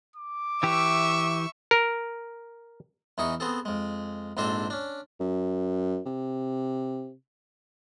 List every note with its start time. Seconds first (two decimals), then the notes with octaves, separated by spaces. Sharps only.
0.16 D6
0.63 E3 G4 E5 C#6
1.71 A#4
3.18 E2 E3 D#4 G#4 C#6
3.40 B3 C4 G#4 A4
3.65 F2 G#3
4.37 A#1 G#2 C4 D4 A4 C5
4.70 C#4 D4
5.20 F#2
6.06 C3